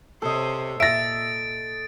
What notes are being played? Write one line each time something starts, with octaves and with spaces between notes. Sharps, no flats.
C3 A4 C5 C#5 D#5
A#2 E5 A6 A#6 D7